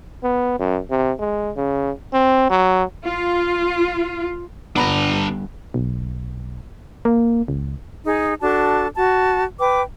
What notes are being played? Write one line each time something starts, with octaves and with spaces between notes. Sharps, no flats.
B3
F#2
C3
G#3
C#3
C4
F#3
F4
G1 B3 D4 A#5 B5
B1
A#3
C#2
D#4 G#4
D4 F#4 A4 A5
F#4 A5
B4 G5 D6